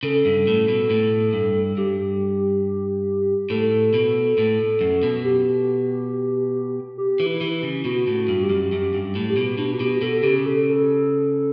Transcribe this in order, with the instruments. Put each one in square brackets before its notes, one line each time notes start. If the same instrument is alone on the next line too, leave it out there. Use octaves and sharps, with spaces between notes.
[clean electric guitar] C#3 [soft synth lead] A4
[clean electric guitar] G2
A2
B2
A2
G2
[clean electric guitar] G2 [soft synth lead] G4
[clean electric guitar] A2 [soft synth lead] A4
[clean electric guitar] B2
A2
F#2
B2
[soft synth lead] G4
G4
[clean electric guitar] E3
[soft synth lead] E4
[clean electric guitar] E3
C#3
[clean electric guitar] B2 [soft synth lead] F#4
[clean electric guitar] A2
[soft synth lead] F#4
[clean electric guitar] G2
[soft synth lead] G4
[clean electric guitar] F#2
[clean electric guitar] F#2 [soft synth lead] G4
[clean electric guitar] G2
A2
[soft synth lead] G4
[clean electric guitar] B2
[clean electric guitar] B2 [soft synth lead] D4
[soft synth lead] F#4
[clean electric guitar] B2 [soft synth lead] G4
[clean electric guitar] B2 [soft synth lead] A4
[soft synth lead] A4
[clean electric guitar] C#3 [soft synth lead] G4
[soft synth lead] A4
A4